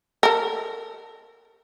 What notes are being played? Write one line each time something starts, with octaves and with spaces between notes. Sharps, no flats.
A4 A#4